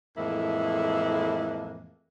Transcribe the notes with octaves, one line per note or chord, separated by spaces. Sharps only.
F2 A2 E3 G#3 A#3 E4